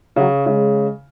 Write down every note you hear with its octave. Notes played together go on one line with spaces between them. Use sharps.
C#3 F#3
C#3 G#3